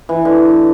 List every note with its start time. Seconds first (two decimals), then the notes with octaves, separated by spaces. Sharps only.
0.09 E3
0.25 D3